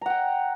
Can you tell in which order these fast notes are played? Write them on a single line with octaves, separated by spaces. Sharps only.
A#5 F#5 G5